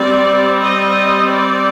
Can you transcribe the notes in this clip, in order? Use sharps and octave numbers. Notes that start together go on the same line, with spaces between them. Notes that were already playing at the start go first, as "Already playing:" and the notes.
Already playing: G3 C4 D5
D#5
D5